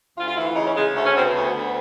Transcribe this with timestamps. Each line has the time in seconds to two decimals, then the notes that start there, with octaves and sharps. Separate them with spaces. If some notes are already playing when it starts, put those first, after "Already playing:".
0.17 D2 F4
0.28 F4
0.36 E3 E4
0.46 F4
0.56 C#3 D#4
0.66 C#4
0.76 C#3 G#3
0.95 D2 A3
1.05 C#4
1.14 D2 C4
1.25 B3
1.35 D2
1.55 D2